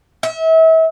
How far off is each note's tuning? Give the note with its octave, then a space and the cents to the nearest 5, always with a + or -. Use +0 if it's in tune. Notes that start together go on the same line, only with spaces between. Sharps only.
E5 -35